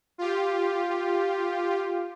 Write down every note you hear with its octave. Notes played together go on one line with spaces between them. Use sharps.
F4 G4